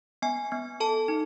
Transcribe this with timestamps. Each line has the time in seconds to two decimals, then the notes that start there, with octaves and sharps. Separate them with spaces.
0.22 B3 G#5
0.52 B3
0.80 A4 A5
1.08 D#4